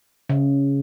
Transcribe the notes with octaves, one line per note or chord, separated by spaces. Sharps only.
C#3